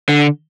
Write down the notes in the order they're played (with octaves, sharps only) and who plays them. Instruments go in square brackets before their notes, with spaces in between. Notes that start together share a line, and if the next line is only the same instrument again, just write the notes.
[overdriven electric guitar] D3